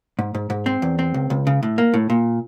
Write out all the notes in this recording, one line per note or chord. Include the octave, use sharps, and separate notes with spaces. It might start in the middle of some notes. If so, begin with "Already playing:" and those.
G#2
G#2
G#2
C4
E2
C4
C#2
C#2
C#3
A2
A#3
A2
A#2